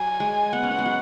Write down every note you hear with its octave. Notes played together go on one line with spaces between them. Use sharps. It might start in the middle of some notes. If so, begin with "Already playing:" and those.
Already playing: F#3 G#5
G#3
B3 F#5
C#4
B3
G#3
F#3